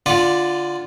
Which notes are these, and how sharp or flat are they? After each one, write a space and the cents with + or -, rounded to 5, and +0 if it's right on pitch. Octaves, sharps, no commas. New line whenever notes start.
D3 +0 F4 +0 D5 +0